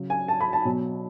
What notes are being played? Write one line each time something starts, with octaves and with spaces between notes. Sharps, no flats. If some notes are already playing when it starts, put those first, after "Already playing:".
Already playing: C#3 F#3
G#5
A5
B5
A5
B2 F#3